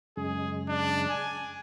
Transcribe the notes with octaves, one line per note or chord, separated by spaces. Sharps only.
F#2 C#3 G#3 G#4
D4
G#5